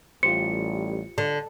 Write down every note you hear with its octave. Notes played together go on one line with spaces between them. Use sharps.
A1 G3 F4 G4 C5 C#7
D3